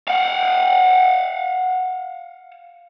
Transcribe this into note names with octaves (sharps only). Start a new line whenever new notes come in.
F5 F#5